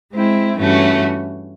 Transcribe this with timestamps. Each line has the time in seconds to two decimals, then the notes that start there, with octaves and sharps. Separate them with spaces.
0.13 G#3 C4 E4
0.57 G2 E3 A3 C#4 F#4